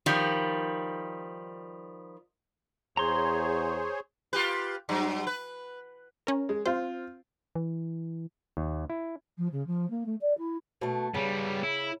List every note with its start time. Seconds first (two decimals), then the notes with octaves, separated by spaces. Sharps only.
0.06 D#3 F3 G3
2.97 E2 G#4 C5 C#5 A#5 C6
4.33 F4 G4 B4
4.89 G2 F#3
5.27 B4
6.27 C#4 A#4
6.49 G#3
6.66 C4 F4 C5
7.55 E3
8.57 D#2
8.90 E4
9.37 F3
9.52 C#3
9.66 F3
9.90 A#3
10.05 A3
10.21 D5
10.38 E4
10.81 B2 A3
11.14 C#3 G3 B3
11.63 E4